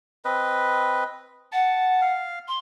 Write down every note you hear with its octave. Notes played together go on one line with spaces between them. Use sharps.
C4 B4 D#5
F#5 A5
F5
C6